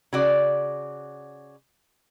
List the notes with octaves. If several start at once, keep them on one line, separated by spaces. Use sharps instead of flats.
C#3 F#4 D5